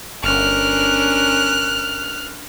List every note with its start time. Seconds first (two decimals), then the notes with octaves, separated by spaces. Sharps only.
0.24 G1 C#4 D4 A#4 F6 F#6